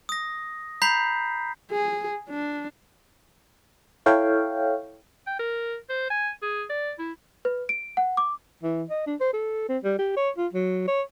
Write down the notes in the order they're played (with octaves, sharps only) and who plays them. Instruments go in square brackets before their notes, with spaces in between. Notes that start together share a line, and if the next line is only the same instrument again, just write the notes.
[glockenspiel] D#6 A#6
A#5 B5 G6 B6 C7
[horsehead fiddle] G#4
D4
[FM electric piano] E4 A4 C#5 F5 G5
[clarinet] G5
A#4
C5
G#5
G#4
D5
E4
[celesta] B4
D7
F#5
D6
[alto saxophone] E3
D#5
D4
C5
A4
C4
G3
G4
C#5
F4
F#3
C#5